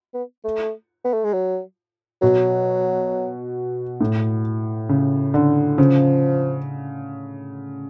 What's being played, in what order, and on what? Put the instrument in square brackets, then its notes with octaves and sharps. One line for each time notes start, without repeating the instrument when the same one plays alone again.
[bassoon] B3
A3
B3
A3
G#3
F#3
[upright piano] B2 [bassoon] F#3
[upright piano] A2
C#3
D3
[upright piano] C#3 [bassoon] F3